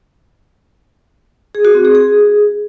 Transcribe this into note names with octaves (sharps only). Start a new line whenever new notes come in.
G#4
F#4
C4
G#4
G#4